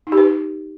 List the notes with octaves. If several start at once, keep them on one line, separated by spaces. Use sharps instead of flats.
D#4
G4
B4